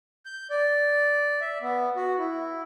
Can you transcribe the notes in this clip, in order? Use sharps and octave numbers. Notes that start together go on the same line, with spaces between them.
G6
D5
E5
B3
F#4
E4